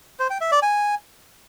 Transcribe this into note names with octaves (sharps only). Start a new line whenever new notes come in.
C5
G5
E5
D5
G#5